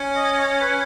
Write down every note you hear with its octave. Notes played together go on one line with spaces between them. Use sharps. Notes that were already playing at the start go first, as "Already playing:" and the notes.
Already playing: C#4
D#5
C#5
B4